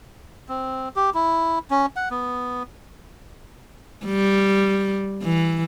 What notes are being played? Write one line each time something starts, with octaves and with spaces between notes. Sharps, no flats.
C4
G4
E4
C#4
F#5
B3
G3
E3